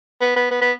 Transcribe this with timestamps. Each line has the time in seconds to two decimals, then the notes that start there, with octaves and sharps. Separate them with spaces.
0.21 B3
0.36 B3
0.51 B3
0.61 B3